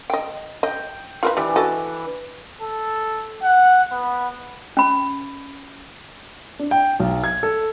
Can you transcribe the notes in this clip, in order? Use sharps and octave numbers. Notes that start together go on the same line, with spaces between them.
D#5 G5
D#5 G5
F4 A#4 B4
E3 G3 D4
F#4 A4 D#5
A4
F#5
B3
C#4 B5
D4
G5
B1
G#6
A4